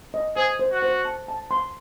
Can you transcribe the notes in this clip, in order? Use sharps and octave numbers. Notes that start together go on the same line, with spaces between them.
D#5
G#4 C5
C5
F#4
C5
A5
A5
C6